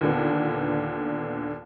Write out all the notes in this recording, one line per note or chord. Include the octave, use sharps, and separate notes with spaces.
D#2 A#2 D3 B3